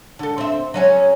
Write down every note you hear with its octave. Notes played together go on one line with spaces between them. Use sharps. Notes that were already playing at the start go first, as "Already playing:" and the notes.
D3 A4
C4 E5
F#3 C#4 G#4